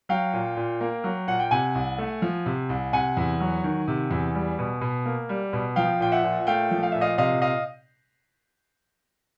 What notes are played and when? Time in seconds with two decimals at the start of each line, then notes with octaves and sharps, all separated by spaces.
0.09 F#3 F5 G5
0.33 A#2
0.57 A#2
0.81 A#3
1.04 F#3
1.27 A#2 F#5
1.40 G5
1.51 C3 F#5 G#5
1.75 C2
1.98 A3
2.22 F3
2.46 C3
2.69 C2
2.93 C3 F#5 G#5
3.17 E2
3.40 F#3
3.64 D#3
3.88 C3
4.11 E2
4.35 G3
4.59 B2
4.81 B2
5.05 A#3
5.29 G3
5.53 B2
5.76 F3 F5 G5
6.00 A#2 G5
6.12 E5 F#5
6.24 A#2
6.40 F#5
6.47 A3 F5 G5
6.71 F3
6.83 F5
6.92 A#2 E5
7.01 D#5 F5
7.18 C3 D#5 F5
7.42 D#5 F5